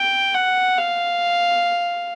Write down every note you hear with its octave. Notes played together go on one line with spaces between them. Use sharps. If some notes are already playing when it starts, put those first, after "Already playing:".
Already playing: G5
F#5
F5